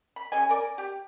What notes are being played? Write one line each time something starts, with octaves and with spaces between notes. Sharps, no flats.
B5
C#4 G#4 D#5 G#5
A#4 D5
G4